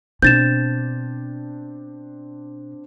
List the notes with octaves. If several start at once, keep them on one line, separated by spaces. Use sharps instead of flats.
B2 C4 D4 G6 A6 E7